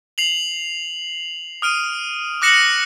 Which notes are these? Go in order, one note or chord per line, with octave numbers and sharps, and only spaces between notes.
C7 F7 F#7
D#6 F6 D7 D#7
D6 F#6 A#6 C#7 E7 F#7